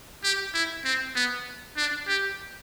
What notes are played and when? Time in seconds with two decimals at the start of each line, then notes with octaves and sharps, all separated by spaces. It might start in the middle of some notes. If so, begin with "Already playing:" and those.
0.24 G4
0.54 E4
0.85 C4
1.16 B3
1.77 D4
2.08 G4